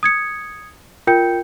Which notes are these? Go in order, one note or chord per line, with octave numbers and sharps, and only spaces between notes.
D#6 G#6 C#7
F4 A#4 G5 G6 C#7